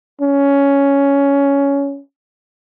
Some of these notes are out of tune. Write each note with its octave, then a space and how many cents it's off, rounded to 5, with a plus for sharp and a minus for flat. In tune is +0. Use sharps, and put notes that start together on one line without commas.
C#4 +10